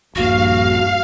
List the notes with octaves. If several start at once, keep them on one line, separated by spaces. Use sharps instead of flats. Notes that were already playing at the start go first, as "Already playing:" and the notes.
D#1 A#1 G2 A#3 F#4 F5